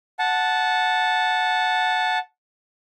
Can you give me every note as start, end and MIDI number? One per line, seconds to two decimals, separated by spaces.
0.19 2.18 78
0.19 2.18 81